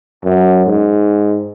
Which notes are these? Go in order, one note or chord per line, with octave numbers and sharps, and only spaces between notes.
F#2
G#2